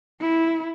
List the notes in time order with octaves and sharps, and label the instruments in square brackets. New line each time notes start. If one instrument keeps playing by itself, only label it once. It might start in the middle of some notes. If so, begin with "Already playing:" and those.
[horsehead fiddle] E4